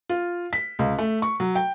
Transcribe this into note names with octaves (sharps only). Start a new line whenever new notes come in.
F4
B6
C#2
A3
C#6
F#3
G5